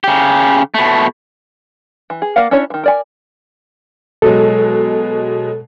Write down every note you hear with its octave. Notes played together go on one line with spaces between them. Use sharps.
C#3 G4
B2 A3
E3
G#4
A#3 A#4 D5 F5 F#5
C#4 D4 E4 C#5
D#3 E3
A#4 D5 G#5
B2 F#3 G#3 A4